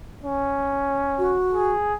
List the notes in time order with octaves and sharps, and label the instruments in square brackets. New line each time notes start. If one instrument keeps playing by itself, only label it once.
[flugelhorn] C#4
[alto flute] F#4
[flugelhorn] G#4